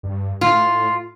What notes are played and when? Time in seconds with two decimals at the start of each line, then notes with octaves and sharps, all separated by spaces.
0.03 G2
0.41 A2 F4